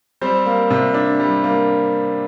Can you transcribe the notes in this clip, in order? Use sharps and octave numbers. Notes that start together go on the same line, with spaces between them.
G3 C4 C5
A#3
C3
D4
G3
A#3